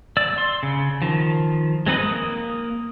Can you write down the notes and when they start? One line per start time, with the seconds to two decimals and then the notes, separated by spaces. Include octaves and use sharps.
0.17 D5 E6
0.38 C6
0.63 C#3
1.02 D#3 F3
1.86 G#3 C4 D#4 B4 D#5
1.99 A#3 D#6